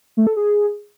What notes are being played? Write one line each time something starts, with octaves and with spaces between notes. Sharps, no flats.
A3
A4
G#4